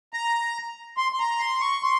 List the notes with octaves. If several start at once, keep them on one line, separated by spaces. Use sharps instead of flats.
A#5
C6
C6
A#5
C6
C#6
C6